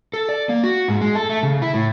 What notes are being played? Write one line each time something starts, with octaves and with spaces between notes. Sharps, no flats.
A4
D5
A#3
F#4
G#2
G#3
A4
A3
C#3
E4
A2